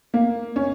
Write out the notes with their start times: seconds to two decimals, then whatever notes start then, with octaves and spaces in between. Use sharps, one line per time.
0.14 A#3
0.56 C#4